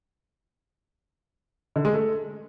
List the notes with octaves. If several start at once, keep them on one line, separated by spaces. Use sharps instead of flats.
D3
G#3
A3